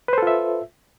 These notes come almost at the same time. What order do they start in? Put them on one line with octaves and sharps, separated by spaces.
B4 C5 A4 F4 E5